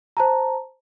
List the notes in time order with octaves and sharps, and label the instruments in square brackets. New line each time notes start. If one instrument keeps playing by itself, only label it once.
[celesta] C5 A5 A#5